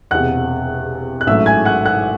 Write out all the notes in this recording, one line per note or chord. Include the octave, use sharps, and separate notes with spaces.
E1 E2 C3 F#5 F#6
F#6
A1 G#2 F#3 A3 E5 E6
G#5 G#6
F#5 F#6
F#5 F#6